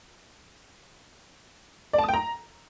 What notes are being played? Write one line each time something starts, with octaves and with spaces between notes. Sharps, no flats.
D5
A5
D#6
G5
A#5